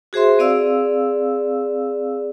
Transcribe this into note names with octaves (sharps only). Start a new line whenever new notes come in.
F#4 G#4 C5 E5 C6
C4 G#4 D5 F5 E6